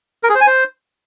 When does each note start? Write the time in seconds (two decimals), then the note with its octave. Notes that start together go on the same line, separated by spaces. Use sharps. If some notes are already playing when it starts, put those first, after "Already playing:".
0.23 A#4
0.29 G#4
0.35 C5
0.41 G#5
0.47 C5